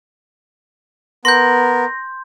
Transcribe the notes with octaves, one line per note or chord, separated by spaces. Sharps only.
B3 A#4 C6 G6 A#6